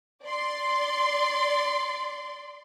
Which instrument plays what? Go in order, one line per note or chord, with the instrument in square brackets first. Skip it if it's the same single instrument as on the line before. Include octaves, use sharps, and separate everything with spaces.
[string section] D5 C6